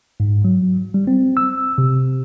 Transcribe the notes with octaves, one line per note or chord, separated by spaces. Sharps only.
G#2
F#3
G3
C4
E6
C3